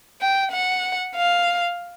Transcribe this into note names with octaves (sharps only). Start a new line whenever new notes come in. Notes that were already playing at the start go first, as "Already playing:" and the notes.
G5
F#5
F5